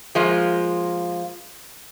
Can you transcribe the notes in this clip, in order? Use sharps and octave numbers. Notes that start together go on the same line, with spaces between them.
F3 G#3 A#3 F4